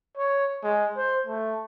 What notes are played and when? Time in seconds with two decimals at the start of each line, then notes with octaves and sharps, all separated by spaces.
0.17 C#5
0.63 G#3
0.97 C5
1.27 A3